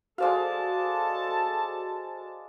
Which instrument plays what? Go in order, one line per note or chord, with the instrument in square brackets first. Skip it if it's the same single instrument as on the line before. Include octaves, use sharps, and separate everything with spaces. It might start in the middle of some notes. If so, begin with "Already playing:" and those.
[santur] G#3 D5 F5 [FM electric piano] F#4 C5 [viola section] A4 A5